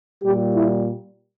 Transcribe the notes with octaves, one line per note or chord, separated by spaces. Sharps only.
A#2 G3 G4
E4